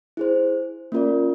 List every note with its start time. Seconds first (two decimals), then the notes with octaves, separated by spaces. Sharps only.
0.17 E4 G#4 C5
0.92 A#3 C#4 F4 A#4 D5